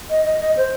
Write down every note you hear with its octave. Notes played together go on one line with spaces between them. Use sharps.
D#5
D#5
D#5
C5